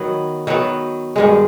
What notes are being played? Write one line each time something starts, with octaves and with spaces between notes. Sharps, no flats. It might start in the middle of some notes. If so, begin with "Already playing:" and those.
Already playing: D#3 F#3 B3
D#3 F#3 B3
G2 D#3 G#3